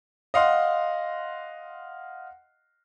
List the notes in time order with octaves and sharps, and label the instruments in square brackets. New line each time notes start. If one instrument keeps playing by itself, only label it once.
[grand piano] D#5 F5 F#5 C6